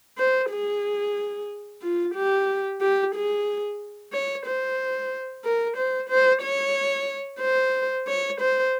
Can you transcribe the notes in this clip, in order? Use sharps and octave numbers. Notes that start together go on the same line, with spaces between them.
C5
G#4
F4
G4
G4
G#4
C#5
C5
A#4
C5
C5
C#5
C5
C#5
C5